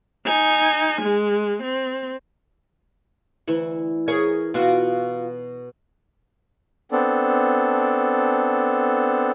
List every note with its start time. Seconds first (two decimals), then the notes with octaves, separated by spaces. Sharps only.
0.25 D#4 G#5
1.02 G#3
1.62 C4
3.47 D2 E3 E4 C#6
4.08 G#4 A#4 C#5
4.54 B2 F4 F#4 D5
6.92 B3 C4 D4 A4